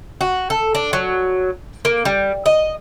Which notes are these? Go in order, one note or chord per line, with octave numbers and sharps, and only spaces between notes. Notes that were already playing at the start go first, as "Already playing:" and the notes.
F#4
A4
D4
F#3
A#3
G3
D#5